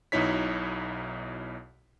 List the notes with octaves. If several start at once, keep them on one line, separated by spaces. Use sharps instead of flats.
B1 B2 D#4 E4 C#5 B6